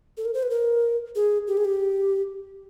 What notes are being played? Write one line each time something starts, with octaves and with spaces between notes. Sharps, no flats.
A4
A#4
C5
B4
A#4
G#4
G4
G#4
G4